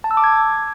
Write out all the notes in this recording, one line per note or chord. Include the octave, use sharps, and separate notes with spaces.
A5
E6
D6
G#6